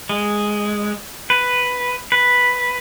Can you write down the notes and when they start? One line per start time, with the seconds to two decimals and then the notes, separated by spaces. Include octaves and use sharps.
0.09 G#3
1.30 B4
2.12 B4